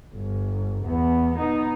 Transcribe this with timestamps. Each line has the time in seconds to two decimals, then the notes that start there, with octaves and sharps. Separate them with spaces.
0.15 G1
0.85 E2 B3
1.34 B3 D#4